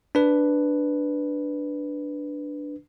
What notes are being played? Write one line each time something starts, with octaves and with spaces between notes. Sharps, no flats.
D4 B4